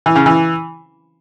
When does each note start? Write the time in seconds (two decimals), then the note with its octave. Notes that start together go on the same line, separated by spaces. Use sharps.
0.06 E3
0.15 C#3
0.26 E3